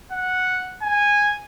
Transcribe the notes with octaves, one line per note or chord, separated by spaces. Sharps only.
F#5
G#5